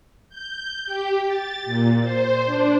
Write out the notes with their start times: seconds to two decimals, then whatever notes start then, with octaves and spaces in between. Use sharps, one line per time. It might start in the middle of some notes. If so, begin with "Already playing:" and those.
0.29 G6
0.86 G4
1.27 A6
1.65 A#2
2.02 C5
2.46 D4